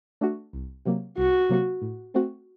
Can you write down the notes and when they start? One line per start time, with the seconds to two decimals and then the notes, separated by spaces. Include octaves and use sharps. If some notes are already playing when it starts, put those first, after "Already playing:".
0.21 A3 D4 F#4
0.53 C2
0.85 C3 F#3 A#3
1.17 C2 F#4
1.49 C3 F#3 A#3
1.82 A2
2.14 A3 C4 F#4